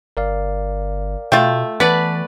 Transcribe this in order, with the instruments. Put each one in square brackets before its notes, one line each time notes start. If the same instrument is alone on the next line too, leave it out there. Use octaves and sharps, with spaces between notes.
[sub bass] G1 [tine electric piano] A#4 D5 F5
[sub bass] B2 [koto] A3 [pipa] F4 G5
[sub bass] E3 [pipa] B3 [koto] B4 D5 [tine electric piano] A5 A6